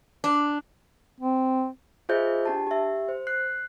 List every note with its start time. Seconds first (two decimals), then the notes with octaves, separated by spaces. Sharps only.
0.24 D4
1.20 C4
2.09 F4 G#4 C5 D#5 E5 G6
2.45 D4 G4 A5
2.67 G4 E5
3.09 C5
3.27 F#6 C7